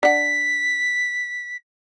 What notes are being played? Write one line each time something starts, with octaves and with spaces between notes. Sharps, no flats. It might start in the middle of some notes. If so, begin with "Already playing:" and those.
D4 F#5 B6